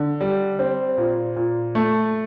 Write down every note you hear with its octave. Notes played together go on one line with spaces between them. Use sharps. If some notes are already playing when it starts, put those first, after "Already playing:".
Already playing: D3
G3
C4
A#2
A#2
A3